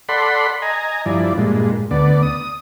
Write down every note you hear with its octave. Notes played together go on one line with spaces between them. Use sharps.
A4 D5 F#5 B5 C6
D#5 G#5 A#5
G2 F3 E4 D5
G2 A#2 G#3
D2 B3 D5
D#6